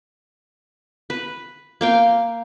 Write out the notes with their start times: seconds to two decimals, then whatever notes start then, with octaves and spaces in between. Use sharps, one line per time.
1.10 B4
1.81 A#3 F5 G5